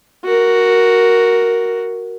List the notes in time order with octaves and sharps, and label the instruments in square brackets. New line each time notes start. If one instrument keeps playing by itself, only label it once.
[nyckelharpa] F#4 A#4